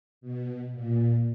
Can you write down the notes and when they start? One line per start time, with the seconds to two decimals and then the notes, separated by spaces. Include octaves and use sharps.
0.21 B2
0.72 A#2